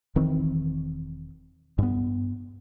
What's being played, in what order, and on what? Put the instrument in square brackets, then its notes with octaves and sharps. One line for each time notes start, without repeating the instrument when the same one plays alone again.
[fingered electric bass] E1 D#3 E3 C4
G2 B3